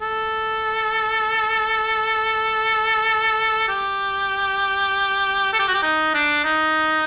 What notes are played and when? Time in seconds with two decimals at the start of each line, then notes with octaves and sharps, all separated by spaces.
0.02 A4
3.69 G4
5.53 A4
5.59 G4
5.68 F#4
5.74 G4
5.83 D#4
6.14 D4
6.45 D#4